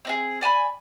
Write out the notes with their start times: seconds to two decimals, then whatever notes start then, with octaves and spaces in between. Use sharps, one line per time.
0.05 C4 D#4 G#4
0.41 D5 G#5 A5 B5